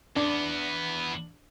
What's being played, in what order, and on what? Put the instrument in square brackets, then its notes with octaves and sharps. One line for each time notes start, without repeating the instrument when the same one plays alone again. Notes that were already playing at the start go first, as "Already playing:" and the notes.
[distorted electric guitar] E2 B3 [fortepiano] D4